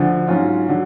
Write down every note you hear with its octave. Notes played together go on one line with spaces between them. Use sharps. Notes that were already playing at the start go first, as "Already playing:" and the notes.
Already playing: D2 D3 F3
G#2 F#3 C#4 F4
D3 F#3